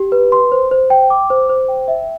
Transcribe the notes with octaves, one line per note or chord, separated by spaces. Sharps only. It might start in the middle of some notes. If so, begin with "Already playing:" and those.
Already playing: G4
B4
C6
C5
C5
G5
D6
C5
C5
G5
E5